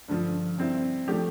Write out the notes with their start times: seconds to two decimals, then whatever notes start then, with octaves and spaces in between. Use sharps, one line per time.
0.08 G2 D3 F3
0.58 C3 G3 C4 E4
1.08 F3 A3 D4 G4